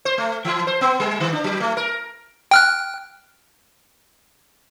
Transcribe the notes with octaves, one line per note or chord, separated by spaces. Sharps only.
C5
A3
E3
C5
B3
G3
D#3
D4
F#3
A3
A#4
G5 F6 F#6